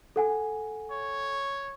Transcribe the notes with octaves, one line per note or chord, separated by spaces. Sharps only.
A4 F#5 G#5
C#5